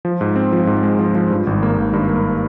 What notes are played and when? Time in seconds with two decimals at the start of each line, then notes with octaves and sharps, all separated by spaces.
0.05 F3
0.21 G#2
0.36 C4
0.53 F3
0.67 G#2
0.83 G#3
0.99 F3
1.15 F3
1.30 G2
1.47 G#1
1.63 A#3
1.78 G#1
1.93 G2
2.09 A#3